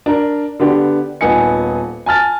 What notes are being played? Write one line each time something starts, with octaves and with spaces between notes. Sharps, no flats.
D4 A#4
D3 B3 D4 G4
D#1 B3 D#4 G#5 C#7
G#5 A5 F6 A6